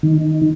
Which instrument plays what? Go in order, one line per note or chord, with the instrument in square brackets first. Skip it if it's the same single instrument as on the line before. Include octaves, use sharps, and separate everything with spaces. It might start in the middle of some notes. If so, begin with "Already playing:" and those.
[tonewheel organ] D#3